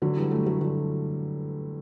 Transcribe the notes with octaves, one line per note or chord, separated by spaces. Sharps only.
D3 F#3
E3 G3
F#3 A3
F#3 A3
D3 F#3